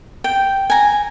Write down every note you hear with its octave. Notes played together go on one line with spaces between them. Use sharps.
G5
G#5 A#5